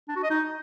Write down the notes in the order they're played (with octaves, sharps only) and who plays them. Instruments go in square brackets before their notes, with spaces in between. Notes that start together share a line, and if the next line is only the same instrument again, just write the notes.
[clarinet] D4
F#4
D#5
D#4